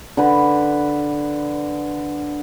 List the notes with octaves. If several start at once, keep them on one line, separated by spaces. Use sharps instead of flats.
D3 B4